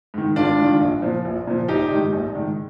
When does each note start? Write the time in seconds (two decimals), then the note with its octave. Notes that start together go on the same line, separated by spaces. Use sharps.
0.14 G#2 D#3
0.36 G#1 D4 F4
0.58 G#2 D#3
0.80 A#1
1.02 A#2 F3
1.25 A#1
1.47 A#2 F3
1.68 A#1 D#4 G4
1.91 G#2 D#3
2.13 A#1
2.35 G#2 D#3